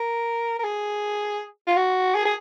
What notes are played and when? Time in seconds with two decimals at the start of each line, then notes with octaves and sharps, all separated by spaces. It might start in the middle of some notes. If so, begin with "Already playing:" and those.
Already playing: A#4
0.59 A#4
0.63 G#4
1.67 F4
1.76 F#4
2.15 G#4
2.25 G#4